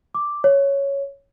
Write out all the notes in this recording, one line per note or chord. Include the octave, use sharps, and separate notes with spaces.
D6
C#5